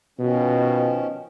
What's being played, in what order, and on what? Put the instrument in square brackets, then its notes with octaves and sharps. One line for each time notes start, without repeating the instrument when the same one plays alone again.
[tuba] B2 [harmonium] D#3 F3 C#4